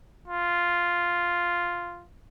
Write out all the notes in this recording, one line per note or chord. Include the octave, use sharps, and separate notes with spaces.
F4